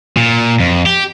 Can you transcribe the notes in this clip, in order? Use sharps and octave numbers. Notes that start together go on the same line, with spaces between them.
A#2
F2
G4